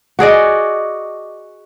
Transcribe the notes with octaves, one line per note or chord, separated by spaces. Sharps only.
F#4 G#4 D5 D#5